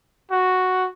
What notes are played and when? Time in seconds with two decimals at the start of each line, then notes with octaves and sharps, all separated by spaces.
0.31 F#4